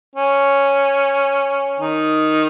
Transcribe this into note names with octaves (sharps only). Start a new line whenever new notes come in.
C#4
D#3 D#4